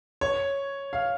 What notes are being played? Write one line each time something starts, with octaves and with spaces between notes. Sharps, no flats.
C#5
F5